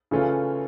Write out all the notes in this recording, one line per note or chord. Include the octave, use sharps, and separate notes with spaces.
C#3 E3 A3 C#4 F4